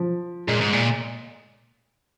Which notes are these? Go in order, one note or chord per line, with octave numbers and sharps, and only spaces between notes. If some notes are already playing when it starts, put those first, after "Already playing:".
Already playing: F3
A#2 G#3
G#2
A#2